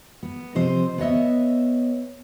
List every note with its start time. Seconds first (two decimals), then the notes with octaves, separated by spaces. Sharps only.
0.23 B3
0.55 C3 F3 C5 D#5
0.98 B3 C#5 D#5 E5